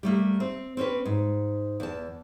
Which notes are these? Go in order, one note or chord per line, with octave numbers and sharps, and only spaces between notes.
G3 A3 A#3
C4
C4 C#4 G4 B4
G#2
E2 A5